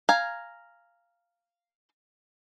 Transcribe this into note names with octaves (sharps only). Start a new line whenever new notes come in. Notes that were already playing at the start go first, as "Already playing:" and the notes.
F5 G#5 A#5